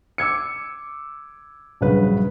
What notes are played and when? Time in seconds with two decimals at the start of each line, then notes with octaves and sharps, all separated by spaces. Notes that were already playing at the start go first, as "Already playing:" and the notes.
0.18 D6 E6 G#6 C#7
1.81 A#1 G2 C#3 F#3 B4